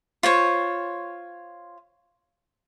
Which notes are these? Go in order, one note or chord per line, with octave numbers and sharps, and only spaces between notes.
F4 C5 C#5